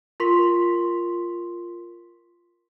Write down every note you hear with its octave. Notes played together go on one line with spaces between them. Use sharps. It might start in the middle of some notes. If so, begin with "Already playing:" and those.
F4 A#4 C6 C#6 B6